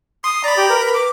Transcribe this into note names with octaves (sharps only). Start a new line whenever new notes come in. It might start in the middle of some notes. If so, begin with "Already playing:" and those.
C6 D#6
D5 A#5 B5
G4
A#4 B4
D6